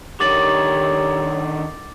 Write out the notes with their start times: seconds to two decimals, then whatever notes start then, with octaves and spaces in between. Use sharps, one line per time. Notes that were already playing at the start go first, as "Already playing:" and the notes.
0.20 D3 D#3 G4 C#5 D6 A6 F#7